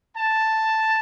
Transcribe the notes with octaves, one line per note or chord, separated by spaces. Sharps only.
A5